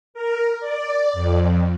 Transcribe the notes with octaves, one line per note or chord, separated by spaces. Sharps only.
A#4
D5
F2